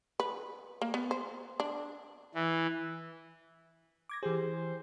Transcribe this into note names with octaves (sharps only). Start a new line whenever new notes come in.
B4
A#3
B3
C5
D4
E3
D6 G#6 A#6
E3 G4 G#4 C5